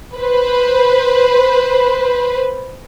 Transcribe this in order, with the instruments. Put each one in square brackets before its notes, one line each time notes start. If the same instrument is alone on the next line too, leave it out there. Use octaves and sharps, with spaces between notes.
[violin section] B4 C5